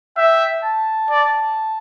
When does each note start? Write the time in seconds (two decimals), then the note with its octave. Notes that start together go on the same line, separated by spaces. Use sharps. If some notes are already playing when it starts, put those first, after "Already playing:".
0.17 E5 G5
0.63 A5
1.10 D5